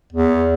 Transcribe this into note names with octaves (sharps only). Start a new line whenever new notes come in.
E2